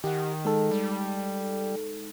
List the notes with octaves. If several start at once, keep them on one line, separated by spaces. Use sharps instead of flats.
D#3 G4 F#5
G#3 D#4 A4
G3